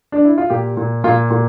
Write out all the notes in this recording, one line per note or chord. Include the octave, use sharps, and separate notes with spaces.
D4
E4
F4
A#2 G4
A#2
A#2 F4
A#2